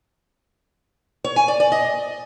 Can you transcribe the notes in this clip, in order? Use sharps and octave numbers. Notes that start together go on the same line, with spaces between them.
C#5
G#5
D5
D5
D#5